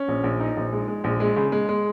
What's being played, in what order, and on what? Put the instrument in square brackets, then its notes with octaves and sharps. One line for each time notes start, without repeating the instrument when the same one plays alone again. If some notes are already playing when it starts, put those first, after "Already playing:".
Already playing: [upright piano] C#4
A#1
A#1
D#4
A#1
G#3
G#3
A#1
G#3
C#3
G#3
G#3